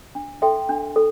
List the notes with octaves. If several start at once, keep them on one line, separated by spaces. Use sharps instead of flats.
D4
A4 E5 G5 C6
D4
A4